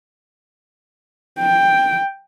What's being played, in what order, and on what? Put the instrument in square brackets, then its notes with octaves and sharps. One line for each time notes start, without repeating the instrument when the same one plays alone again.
[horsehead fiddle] G5